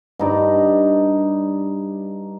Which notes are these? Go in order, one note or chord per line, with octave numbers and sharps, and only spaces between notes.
G2 D#4 D5